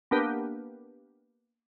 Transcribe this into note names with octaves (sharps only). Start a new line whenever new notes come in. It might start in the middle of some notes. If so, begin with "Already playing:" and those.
A#3 B3 D4 G4 A#4 B4